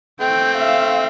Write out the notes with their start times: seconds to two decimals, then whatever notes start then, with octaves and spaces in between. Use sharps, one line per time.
0.21 A3 C4 G5
0.57 E5 F5